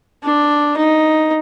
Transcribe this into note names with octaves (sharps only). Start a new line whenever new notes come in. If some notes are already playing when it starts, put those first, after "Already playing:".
D4
D#4